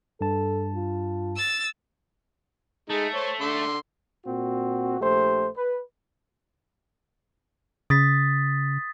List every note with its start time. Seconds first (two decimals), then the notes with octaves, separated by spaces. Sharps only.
0.21 G2 A4 A5
0.76 F4
1.36 E6 A6
2.89 G#3 A3 D#4
3.14 C5 C#5
3.41 D3 C6
4.25 A#2 C4 F#4
5.00 A#1 A3 G4 C5
5.57 B4
7.90 C#3 D#6 A6 B6